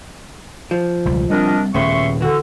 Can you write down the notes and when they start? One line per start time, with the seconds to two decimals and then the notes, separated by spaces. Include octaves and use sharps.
0.71 F3
1.05 E1 C#2 G3
1.30 G3 C4 D4 A#4 D#5
1.74 D#1 A2 C#3 B3 E5 C6 C#6
2.21 D3 E3 F#4